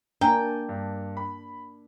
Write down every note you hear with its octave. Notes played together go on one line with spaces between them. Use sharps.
A#3 D4 G5 G#5 A#5
G2
B5